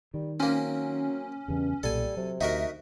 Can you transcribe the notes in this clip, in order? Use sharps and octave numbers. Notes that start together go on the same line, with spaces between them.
D#3 G3
F#3 A#3 C4 C#4
E2 G2 C#3
B1 A#2 G3 A4 G#5
C3 F#3
D2 D#4 F#4 A#4 E5